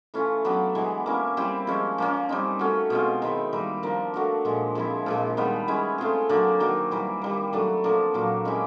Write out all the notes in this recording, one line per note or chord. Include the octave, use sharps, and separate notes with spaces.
E3 A3 C#4 F4
F#3 B3 D4 G4
E3 G#3 B3
A#3 C#4 E4
G3 C4 E4 G4
F3 G#3 C#4
F3 A#3 C#4
G3 C4 D#4
A3 C#4 F#4
B2 G#3 C4 F4
D#3 G#3 C4 E4
D#3 G3 A#3
F3 A#3 D4
A3 D4 F#4 A#4
A#2 F3 G#3
F3 G#3 C4 E4
A#2 F3 G#3
D#3 G3 B3
G#3 C#4 E4
A3 C4 F4 G#4
D3 F#3 A#3 D4
D#3 F#3 A#3
E3 G3 A#3
D#3 G3 A#3
F#3 A3 D4
D3 F3 A#3 D4
A#2 F#3 A#3
G#3 C#4 E4 G4